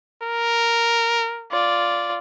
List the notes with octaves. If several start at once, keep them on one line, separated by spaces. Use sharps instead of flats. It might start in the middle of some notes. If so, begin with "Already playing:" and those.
A#4
F4 D5